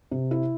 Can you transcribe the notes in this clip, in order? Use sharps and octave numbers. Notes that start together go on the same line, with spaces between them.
C3
E4